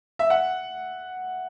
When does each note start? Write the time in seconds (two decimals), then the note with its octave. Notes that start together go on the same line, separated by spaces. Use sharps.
0.19 E5
0.30 F#5